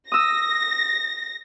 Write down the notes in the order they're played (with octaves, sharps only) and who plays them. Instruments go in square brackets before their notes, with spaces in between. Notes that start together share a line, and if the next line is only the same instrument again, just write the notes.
[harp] D#6 E6 [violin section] A#6